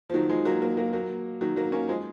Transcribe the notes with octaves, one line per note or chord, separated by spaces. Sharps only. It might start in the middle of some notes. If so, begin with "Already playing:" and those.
F3
D#3 F#3
F3 G#3
F#3 A#3
F#3 A#3
F#3 A#3
F#3 A#3
D#3 F#3
F#3 A#3
A#3 C#4
F3 G#3